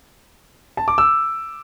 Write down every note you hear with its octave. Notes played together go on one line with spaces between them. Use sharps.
A5
D6
E6